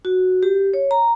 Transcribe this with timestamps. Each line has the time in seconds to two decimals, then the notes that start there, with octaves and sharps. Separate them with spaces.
0.05 F#4
0.43 G4
0.74 C#5
0.91 A#5